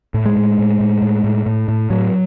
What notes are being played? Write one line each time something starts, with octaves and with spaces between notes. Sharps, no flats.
A2
G#3
A2
A2
A2
A2
A2
A2
A2
A2 F#3